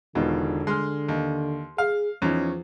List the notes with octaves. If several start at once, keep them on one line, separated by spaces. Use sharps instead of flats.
E1 B2 D3 D#3 F4
G#3 C6 F6
D#2
G#4 F5
E2 F3 C#4 D#4